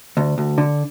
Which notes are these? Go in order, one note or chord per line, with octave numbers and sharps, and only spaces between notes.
D2
D2
D3